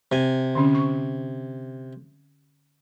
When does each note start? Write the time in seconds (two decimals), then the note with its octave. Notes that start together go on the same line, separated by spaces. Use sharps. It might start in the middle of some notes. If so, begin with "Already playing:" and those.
0.12 C3 G#5
0.55 D3 C#4
0.75 C#6